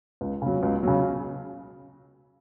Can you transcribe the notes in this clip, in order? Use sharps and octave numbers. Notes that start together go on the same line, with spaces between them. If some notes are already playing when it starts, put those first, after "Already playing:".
C#2
C#3 F#3
C#2
C#3 F#3